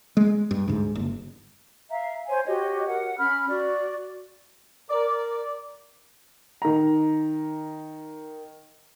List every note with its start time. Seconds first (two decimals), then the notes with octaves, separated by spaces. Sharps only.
0.17 G#3
0.51 G2
0.68 D2 G#2
0.95 F#1
1.90 E5 F5 A#5
2.28 C5 C#5 G#5 C6
2.47 F#4 G4 C#5 D#5
2.87 A#4 F#5
3.19 C#4 B5 F6
3.48 F#4 D5
4.89 A#4 D5
6.62 D#3 A#5